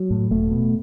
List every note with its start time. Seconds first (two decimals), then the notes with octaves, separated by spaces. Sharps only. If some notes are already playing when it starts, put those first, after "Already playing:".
Already playing: F#3
0.10 A2
0.30 E1 A3
0.51 B2